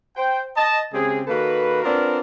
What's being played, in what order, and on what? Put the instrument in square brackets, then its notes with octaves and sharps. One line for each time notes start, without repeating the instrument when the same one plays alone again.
[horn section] C5 G5
D#5 A5
C#3 G#3 C4 G4 G#4
D#3 A#3 F#4 A4 B4
B3 C4 D4 F4 A#4 D5